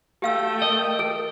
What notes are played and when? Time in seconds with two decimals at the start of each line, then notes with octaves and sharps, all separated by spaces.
0.22 A3 G4 F5 G5 E6
0.62 A#4 D#5
0.99 A4